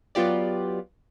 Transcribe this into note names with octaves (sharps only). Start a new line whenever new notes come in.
F#3 B3 F4 G4 D5